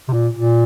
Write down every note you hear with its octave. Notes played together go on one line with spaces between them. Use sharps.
C3
A#2
A#2